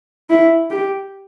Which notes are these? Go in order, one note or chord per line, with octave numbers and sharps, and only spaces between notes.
E4
G4